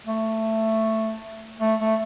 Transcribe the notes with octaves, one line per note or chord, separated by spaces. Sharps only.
A3
A3
A3